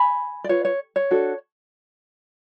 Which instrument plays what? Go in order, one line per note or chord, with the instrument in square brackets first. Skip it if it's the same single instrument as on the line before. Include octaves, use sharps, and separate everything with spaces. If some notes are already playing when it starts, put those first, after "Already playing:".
Already playing: [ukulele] G#5 B5
D5
F4 B4 C#5
C#5
C#5
D4 F#4 A4